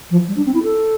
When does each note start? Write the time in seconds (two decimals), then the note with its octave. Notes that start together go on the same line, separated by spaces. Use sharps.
0.11 F3
0.28 G3
0.37 D4
0.46 C4
0.54 E4
0.64 A4